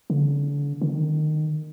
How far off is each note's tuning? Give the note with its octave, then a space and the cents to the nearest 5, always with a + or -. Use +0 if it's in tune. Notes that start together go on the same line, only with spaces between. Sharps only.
D3 -40
D#3 -25